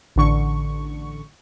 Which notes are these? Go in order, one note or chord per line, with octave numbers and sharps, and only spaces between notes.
A1 D3 C#6